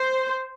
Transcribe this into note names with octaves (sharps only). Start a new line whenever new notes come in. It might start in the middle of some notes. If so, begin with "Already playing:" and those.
Already playing: C5